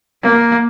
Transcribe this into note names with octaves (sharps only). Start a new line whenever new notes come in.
A#3